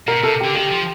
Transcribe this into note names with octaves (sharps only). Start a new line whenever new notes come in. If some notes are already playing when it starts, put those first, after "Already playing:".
B2 A#4
C3 A4
D3 G4
D#3 G4
F3